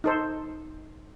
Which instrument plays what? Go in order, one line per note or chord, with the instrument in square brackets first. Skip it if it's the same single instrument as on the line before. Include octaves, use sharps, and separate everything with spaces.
[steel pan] D#4 A4 C5